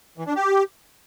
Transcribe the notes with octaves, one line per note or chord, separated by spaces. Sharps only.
E3
D4
G4